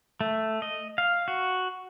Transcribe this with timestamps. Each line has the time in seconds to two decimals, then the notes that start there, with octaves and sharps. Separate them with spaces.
0.21 A3
0.62 D#5
0.98 F5
1.28 F#4